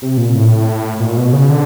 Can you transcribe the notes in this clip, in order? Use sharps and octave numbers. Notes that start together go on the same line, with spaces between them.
C3
A#2
A2
A#2
B2
C#3
D3